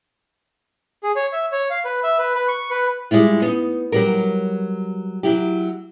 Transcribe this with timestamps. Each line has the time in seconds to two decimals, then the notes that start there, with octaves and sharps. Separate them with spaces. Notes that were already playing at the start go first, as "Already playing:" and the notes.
1.03 G#4
1.16 C#5
1.33 E5
1.52 C#5
1.70 F5
1.85 B4
2.03 E5
2.18 B4
2.35 B4
2.48 C#6
2.70 B4
3.11 G3 G#3 B3 E4 F4
3.42 B3 D#4
3.92 F#3 G3 A#4
5.23 F#3 E4 G4